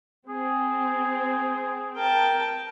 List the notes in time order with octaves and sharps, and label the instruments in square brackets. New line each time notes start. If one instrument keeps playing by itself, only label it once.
[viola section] C4 [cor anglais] G#4
[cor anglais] A#4 [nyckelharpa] G5 A5